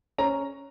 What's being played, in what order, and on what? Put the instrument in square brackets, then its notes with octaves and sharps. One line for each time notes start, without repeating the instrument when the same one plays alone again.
[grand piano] C#4 A#5